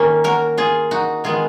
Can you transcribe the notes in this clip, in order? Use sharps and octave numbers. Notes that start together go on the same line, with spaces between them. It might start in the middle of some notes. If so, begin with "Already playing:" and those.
Already playing: D#3 A#3 C#4
F#4 A#4
F4 G#4
D#4 F#4
D#3 G#3 B3 F4 G#4